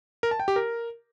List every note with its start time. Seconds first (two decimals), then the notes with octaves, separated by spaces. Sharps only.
0.23 A#4
0.31 A5
0.40 G5
0.48 G4
0.56 A#4